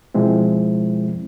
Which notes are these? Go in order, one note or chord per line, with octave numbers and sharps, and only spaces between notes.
B2 F3 G#3 C4 E4